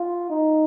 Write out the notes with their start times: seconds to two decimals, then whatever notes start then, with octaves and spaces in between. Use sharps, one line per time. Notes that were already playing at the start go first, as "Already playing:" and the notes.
Already playing: F4
0.30 D#4